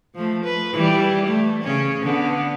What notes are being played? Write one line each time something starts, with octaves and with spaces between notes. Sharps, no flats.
F3 A3
B4
E3 G3
A3
C#3 C#4
D3 B3